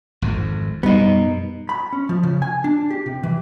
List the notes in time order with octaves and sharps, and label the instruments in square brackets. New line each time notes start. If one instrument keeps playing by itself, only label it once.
[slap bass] G#1 F2
[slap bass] F#2 B2 [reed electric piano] G3 [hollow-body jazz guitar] B3 D#4
[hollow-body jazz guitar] B5
C#4
F3
C#3
G#5
D4
G4
C3
E3